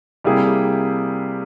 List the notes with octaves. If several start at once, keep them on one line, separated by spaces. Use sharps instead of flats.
C3 G3 A#3 E4 G#4